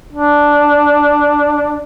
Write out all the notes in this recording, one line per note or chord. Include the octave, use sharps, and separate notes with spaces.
D4